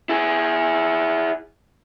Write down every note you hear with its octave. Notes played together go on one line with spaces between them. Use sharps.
E4 G#4